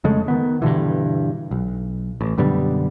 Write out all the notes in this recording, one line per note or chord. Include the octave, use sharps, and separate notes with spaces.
F2 C#3 G#3 A3
D#3 B3
G2 B2 D3 E3
B1
A1
F#2 B2 D3 G3